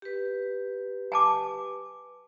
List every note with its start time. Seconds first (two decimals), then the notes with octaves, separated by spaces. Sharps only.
0.02 G4 B4
1.12 G#5 A5 D6